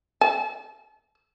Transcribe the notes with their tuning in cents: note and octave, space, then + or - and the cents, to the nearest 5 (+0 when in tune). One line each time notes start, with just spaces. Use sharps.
A5 -35